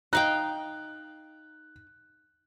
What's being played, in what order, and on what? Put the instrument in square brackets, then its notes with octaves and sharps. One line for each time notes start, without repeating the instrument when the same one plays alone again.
[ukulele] D#4 [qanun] D#5 F5 G5 [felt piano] F#6